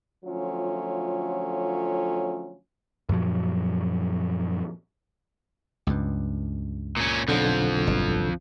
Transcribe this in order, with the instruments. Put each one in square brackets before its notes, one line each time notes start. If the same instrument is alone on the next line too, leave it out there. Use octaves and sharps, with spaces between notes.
[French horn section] D3 F3 F#3 A3 C#4 F4
[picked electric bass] F#2 A#2 F3 F#3
[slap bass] C#2 G2
[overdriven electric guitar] A#2 C#4
[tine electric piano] B1 D3 [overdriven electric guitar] F2 F3
[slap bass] G1